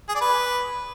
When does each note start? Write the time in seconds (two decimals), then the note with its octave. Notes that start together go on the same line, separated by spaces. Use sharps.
0.09 G#4
0.15 D5
0.21 B4